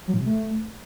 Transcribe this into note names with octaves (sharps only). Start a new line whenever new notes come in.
F#3
A2
C3
A3